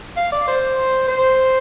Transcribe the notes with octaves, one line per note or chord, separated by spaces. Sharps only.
F5
D5
C5
C5